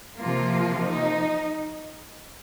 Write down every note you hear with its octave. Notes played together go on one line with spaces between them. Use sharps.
C3 F3 A#3 F4
D#4